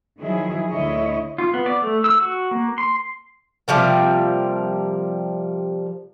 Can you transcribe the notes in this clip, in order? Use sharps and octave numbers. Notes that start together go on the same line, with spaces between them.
D#3 F3 F#3 E4 G#4
D2 D3 E4 C#5 D#5
F4
B3
D5
A3
E6
F#4
A#3
C6
C3 F3 G3 A#3